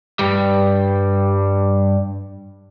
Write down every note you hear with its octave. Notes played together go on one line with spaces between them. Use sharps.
G2 G3